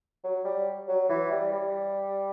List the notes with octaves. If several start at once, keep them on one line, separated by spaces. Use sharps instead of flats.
F#3
G3
F#3
E3
G3
G3